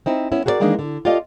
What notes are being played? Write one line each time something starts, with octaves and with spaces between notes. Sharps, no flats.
C4 D#4 E4
B3 C#4 E4
F#4 G#4 A#4 C5 D5
D#3 E3 G#3 A#3 D4 D#4
D3
F4 G4 A4 D5 D#5 F5